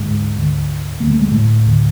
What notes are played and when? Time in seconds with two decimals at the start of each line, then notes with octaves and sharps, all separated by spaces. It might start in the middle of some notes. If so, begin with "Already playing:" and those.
Already playing: D2 G#2 D3 G#3
0.36 D2 D3
1.00 D2 D3 A#3
1.11 A3
1.21 G#3
1.32 A2 A3
1.66 D2 D3